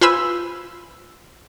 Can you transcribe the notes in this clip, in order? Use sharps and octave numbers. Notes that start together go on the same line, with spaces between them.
F4 B4 C5 G#5 B5 E6